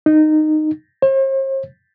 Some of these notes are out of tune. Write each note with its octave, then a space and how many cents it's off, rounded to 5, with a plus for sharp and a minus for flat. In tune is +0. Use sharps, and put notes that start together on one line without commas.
D#4 -15
C5 +45